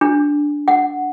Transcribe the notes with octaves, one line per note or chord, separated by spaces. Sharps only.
D4
F#5